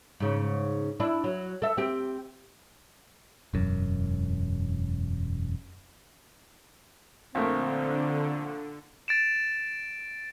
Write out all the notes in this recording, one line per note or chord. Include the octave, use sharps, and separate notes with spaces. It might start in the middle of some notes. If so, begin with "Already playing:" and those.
G#2 C#3
D4 E4
F#3
A4 E5
C4 G4
E1 F#2
A#1 D3 A3 C4 A#4
A6 D7 E7